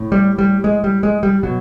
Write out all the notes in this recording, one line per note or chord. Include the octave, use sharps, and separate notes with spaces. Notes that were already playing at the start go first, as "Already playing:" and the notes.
Already playing: A2
G3
G3
G#3
G3
G#3
G3
B2 F#3